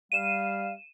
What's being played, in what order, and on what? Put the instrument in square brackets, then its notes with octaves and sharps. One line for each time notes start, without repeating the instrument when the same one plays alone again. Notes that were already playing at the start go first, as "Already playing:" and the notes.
[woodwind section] G3 F5 [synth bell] D#7 E7